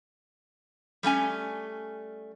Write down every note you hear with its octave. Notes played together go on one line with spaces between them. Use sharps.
G3 A3 C#4 G#5